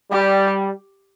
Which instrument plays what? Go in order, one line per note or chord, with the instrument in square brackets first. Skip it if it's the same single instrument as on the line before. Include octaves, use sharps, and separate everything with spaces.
[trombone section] G3 [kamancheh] G4